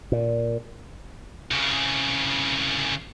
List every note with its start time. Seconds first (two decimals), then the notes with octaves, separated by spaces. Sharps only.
0.12 A#2
1.51 C2 C#3